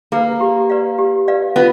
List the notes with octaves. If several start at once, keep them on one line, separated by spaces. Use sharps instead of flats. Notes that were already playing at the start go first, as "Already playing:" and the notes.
A#3 G#4 B4
G4
B4 D5 F5
G4
B4 D5 F5
B3 F4